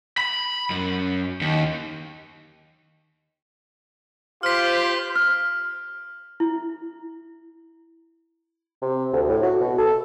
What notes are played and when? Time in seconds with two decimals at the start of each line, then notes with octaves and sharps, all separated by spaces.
0.18 B5
0.70 F#2
1.41 D#2
4.43 F4 G4 C5 F6 B6
5.15 F6
6.40 E4
8.82 C3
9.13 D2
9.29 A2
9.43 F#4
9.60 B2
9.78 A4